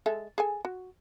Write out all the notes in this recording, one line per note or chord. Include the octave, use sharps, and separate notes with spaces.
G#3 A4 E5
G#4 A4 G#5
F#4